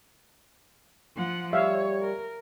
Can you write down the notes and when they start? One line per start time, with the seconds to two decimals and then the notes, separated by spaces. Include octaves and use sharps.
1.16 F3 F#5
1.53 G3 C#5 E5 F5
2.01 A#4